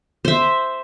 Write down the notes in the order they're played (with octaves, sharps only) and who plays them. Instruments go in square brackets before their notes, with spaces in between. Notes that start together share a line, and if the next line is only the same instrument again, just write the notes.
[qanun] C5 E5